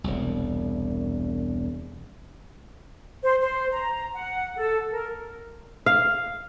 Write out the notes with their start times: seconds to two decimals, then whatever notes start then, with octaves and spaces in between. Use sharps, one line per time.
0.04 E1 C2
3.22 C5
3.41 C5
3.72 A#5
4.13 F#5
4.56 A4
4.90 A#4
5.86 F5